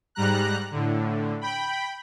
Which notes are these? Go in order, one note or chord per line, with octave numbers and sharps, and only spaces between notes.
G#2 G3 A#5 F#6
A2 D3
G5 B5